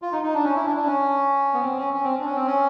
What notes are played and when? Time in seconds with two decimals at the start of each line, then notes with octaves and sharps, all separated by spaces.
0.02 F4
0.12 D#4
0.23 D#4
0.34 D4
0.44 C#4
0.55 E4
0.66 D4
0.76 D4
0.87 C#4
1.54 B3
1.61 C4
1.78 C#4
1.94 C#4
2.04 C4
2.19 D4
2.25 C#4
2.35 C4
2.46 C#4